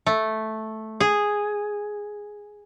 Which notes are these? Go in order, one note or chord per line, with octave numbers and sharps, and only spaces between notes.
A3
G#4